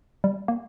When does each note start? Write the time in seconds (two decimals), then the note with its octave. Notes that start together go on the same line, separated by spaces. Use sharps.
0.24 G3
0.48 A#3